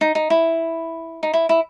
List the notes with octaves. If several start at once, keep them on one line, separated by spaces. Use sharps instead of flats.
D#4
D#4
E4
D#4
E4
E4